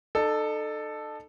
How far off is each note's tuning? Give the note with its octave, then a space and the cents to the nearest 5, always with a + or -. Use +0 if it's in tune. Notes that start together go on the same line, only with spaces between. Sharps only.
D#4 -40 A4 +0